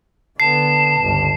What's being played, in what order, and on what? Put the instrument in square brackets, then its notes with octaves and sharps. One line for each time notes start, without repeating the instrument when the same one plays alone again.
[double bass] D3 B3 [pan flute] A5 [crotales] C7
[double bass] G1 C#2